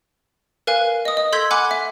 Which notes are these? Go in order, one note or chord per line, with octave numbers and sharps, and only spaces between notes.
A#4 B4 F5 G#5 F#6
D#5 D#6
D#5
A4 C6 E6 G6 G#6 B6
F#5 G#5 B5 D6 F#6
E5